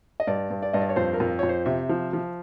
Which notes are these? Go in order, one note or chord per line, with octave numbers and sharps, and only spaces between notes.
D#5
G2 D5
G2
D5
G2 D#5
D5
C#5
F2 C5
A#4
F2
F2 C#5
C5
C3 E5
F3
F3